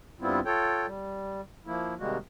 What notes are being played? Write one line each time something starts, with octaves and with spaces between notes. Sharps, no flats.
G2 G3 B3 C4 E4 F4
F4 A4 C#5 G5
G3
F3 A#3 E4
C3 D#3 G3 G#3 A#3 F#4